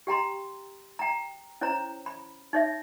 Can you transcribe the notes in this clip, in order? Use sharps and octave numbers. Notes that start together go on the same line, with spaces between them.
G4 G5 A#5 C6
G5 A#5
C#4 E4 C5 C#5 A#5
B5
D#4 C#5 E5